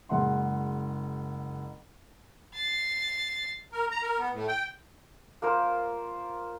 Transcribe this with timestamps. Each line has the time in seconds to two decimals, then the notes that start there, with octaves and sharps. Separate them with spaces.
0.09 F#1 G#3 F#5 C6
2.54 A6 C7
3.72 A#4
3.91 A#5
4.02 A#4
4.18 B3
4.33 A2
4.48 G5
5.42 A#3 F4 A#4 C5